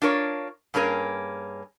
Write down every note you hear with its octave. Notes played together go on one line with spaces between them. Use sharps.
D4 F4 A#4 C#5
G2 A#3 C#4 G#4 A#4